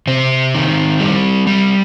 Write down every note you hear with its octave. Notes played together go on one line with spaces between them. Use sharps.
C3 C4
D#3
G3
G3